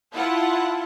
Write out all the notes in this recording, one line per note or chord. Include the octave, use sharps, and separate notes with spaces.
E4 F4 F#5 A5